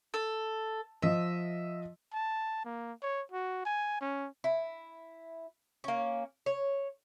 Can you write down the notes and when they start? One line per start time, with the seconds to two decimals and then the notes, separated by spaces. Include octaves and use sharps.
0.14 A4
1.02 F3 D#5 E5
2.13 A5
2.65 A#3
3.02 C#5
3.31 F#4
3.65 G#5
4.01 C#4
4.44 E4
5.84 A#3 C#4
6.46 C#5